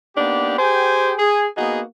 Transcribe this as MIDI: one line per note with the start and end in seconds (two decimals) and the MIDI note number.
0.16 0.57 58
0.16 0.57 59
0.16 0.57 62
0.16 0.57 63
0.16 0.57 67
0.58 1.13 67
0.58 1.13 68
0.58 1.13 72
0.58 1.13 79
0.58 1.13 80
1.18 1.45 68
1.57 1.81 58
1.57 1.81 59
1.57 1.81 63
1.57 1.81 66
1.57 1.81 68